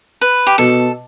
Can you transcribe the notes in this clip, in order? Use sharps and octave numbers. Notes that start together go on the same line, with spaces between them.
B4
G4
B2 A4